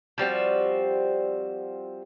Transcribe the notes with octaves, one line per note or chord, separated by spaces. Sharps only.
F3 G3 C4 F#4